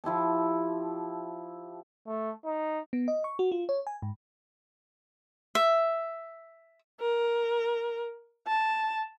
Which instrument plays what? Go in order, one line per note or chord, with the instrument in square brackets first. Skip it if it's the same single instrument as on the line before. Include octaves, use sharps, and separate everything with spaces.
[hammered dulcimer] F3 E4 G4 A5
[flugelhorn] A3
D#4
[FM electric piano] B3
D#5
C#6
F#4
F4
C#5
G#5
G#2
[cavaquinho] E5
[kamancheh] A#4
A5